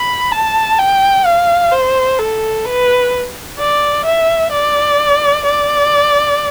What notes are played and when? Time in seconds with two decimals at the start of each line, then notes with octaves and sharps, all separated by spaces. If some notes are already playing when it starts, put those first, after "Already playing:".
Already playing: B5
0.32 A5
0.79 G5
1.25 F5
1.72 C5
2.19 A4
2.65 B4
3.59 D5
4.05 E5
4.52 D5
5.46 D5